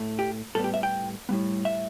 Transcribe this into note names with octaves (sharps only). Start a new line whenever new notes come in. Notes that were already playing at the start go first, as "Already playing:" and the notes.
Already playing: A2 A3
G4
A2 G3 B3 A4
G4
E5
G5
A2 G3 B3
E5